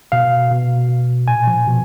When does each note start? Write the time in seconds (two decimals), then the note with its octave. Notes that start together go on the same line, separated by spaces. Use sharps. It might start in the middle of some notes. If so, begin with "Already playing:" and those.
0.12 B2 F5
0.51 B2
0.89 B2
1.28 A#2 G#5
1.47 F3
1.67 B2